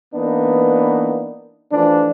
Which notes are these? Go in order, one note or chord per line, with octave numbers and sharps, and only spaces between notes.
E3 A#3 B3 D4 D#4
E3 F3 A3 D4